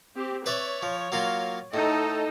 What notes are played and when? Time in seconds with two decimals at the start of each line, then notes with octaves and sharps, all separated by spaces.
0.16 C4 G4
0.46 B4 C#5 D5 E5
0.83 F3
1.12 F#3 A#3 F4
1.74 A2 D#4 A4 D#5